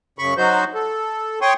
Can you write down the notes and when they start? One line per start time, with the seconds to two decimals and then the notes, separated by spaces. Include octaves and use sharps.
0.19 F#2 C#3 B5 C#6
0.37 F#3 D#4 F#4 C5 G6
0.75 A4
1.42 C#5 G5 C6 C#6 D#6